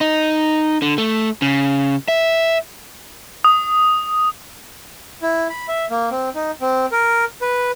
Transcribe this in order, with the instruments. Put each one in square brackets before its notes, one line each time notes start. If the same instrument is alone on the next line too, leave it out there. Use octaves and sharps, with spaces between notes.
[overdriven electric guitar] D#4
D3
A3
C#3
E5
[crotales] D#6
[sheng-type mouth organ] E4
B5
E5
A#3
C4
D#4
C4
A#4
B4